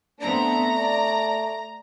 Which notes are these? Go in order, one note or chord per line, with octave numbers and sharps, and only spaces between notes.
A3 B3 C4 D4 A#5
D5